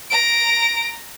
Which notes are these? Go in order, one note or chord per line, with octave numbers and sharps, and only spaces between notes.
A#5 D7